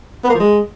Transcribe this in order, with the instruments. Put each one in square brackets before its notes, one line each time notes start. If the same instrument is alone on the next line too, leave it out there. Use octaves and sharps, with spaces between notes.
[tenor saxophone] B3
A#3
F3
G#3